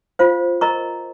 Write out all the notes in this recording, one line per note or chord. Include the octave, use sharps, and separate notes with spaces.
F4 C5 F5
A#4 D#5 A#5 C#6